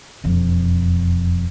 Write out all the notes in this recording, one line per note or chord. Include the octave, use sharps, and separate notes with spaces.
E1 F2